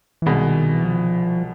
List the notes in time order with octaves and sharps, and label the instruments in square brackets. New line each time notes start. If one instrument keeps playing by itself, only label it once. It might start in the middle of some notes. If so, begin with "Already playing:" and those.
[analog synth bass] E3
[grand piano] C2 B2 G#3 [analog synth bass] D#3
[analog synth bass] E3
F3